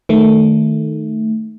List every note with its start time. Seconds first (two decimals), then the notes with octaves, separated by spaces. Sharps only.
0.09 D#3 A3